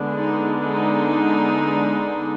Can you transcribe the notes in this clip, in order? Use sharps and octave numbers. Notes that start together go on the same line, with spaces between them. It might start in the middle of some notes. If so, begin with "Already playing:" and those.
Already playing: D3 G#3 B3 D4
D#4
D#4